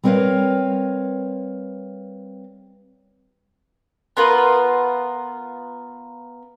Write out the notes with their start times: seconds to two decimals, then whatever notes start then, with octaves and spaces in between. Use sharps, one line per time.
0.04 G3 C4 A#4 B4 C#5 F5
4.17 B3 F4 A#4 B4